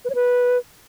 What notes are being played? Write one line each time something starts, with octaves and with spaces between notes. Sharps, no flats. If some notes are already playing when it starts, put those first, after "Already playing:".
B4
C#5
B4